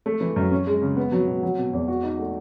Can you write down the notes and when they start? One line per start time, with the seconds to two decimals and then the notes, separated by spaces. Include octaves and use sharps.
0.06 A3
0.21 E3
0.36 F#2
0.51 C#4
0.67 G#3
0.82 C#3
0.97 B3
1.12 F#3
1.27 B2
1.43 F#3
1.58 B2
1.73 E2
1.88 F#4
2.04 D#4
2.19 A3